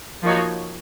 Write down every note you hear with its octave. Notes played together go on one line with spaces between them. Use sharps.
F3 A#3 D#4 F#4 C#5